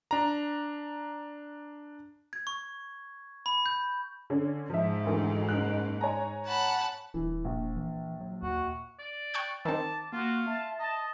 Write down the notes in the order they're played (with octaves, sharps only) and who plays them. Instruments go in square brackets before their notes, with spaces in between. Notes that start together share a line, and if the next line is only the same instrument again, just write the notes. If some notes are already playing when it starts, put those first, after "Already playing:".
[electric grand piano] D4 A#5
[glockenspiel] G#6
C#6
B5
G6
[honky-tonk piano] D3 C#4
[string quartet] G#2 [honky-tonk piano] F3 E5
[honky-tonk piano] D2 D#3 E3
F#1 F#6
C#5 G#5 A#5
[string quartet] F#5 A5 B5
[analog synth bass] D#1 [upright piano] E3
[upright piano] A#1
[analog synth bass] E3
F#3
[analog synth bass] D#2 [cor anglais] F#4
[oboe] D5
[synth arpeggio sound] G5 C#6 F#6
[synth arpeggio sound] D#3 C4 [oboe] A5 [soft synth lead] D6
[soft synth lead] A#3 [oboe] F4 [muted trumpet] F#4
[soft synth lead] E5 [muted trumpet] A5
[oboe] D#5 [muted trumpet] A5